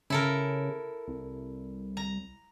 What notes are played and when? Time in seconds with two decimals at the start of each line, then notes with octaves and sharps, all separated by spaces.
0.10 C#3 E4 A4 A#4
1.08 C2
1.97 A#5